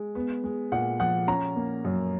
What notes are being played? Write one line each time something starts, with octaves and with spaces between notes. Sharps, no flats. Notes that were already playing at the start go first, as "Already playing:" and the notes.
Already playing: G#3
B3
G#3
A#2 F#5
F3 F#5
C#4 A#5
A#3
F#2